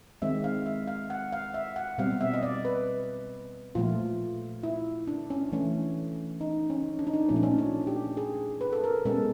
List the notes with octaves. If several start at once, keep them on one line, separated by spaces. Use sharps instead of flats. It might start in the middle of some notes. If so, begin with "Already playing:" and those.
D#3 G#3 C4 E5
F5
E5
F5
F#5
F5
E5
F#5
B2 G3 C4 F5
E5
D#5
D5
B4
A#2 F3 A3 F4
E4
D4
C#4
E3 A3 C#4
D#4
C#4
D4
D#4
D4
A#2 F3 A3 C#4
D4
C#4
D4
G4
G#4
B4
A4
A#4
B2 G#3 C#4 A4